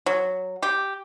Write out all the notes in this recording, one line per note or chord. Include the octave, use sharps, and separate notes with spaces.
F#3
G4